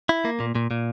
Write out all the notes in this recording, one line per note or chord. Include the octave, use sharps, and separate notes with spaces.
E4
A#3
A#2
A#2
A#2